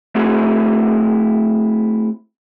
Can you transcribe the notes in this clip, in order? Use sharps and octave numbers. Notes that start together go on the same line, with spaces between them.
A3 C4 E4 F#4 G#4